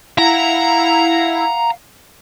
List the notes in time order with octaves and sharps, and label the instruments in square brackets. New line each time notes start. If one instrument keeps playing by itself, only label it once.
[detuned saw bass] E4 [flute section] F5 F#5 [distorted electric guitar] A#5